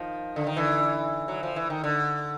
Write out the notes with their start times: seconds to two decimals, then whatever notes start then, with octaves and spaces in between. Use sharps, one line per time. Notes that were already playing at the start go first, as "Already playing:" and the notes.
Already playing: D#3 F3
0.36 D3
0.47 D#3
0.57 D3 E3
1.28 F#3
1.43 F3
1.56 E3
1.70 D#3
1.84 D3